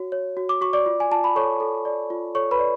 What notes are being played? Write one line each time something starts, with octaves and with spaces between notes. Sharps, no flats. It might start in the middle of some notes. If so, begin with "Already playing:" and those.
Already playing: F#4 C#5
C#5
F#4
D6
F#4 C#6
D5 D6
F4
G#5
F4 A5
B5
A4 C#5 C#6
A4
D5
F4
A4 C#5 C#6
B4 B5
D5